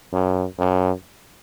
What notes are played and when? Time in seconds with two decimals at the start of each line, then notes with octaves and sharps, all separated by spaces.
0.13 F#2
0.59 F#2